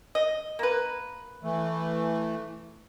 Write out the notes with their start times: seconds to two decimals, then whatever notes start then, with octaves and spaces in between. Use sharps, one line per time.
0.15 D#5
0.59 A#3 B4
1.43 E3 A3